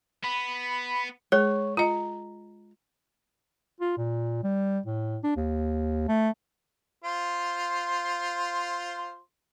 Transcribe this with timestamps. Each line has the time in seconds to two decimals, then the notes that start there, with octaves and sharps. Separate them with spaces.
0.24 B3 B5
1.32 G#3 G#4 C#5
1.77 F4 D#5 A#5
3.80 F4
3.98 A#2
4.44 G3
4.86 A2
5.23 D4
5.36 D#2
6.08 A3
7.04 F4 C5 C6